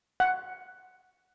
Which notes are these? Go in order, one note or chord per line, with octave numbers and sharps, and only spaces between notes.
F#5